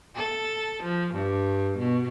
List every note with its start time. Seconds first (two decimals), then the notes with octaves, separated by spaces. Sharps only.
0.16 A4
0.83 F3
1.14 G2
1.79 B2